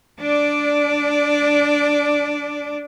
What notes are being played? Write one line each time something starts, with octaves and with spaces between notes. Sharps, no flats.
D4 D5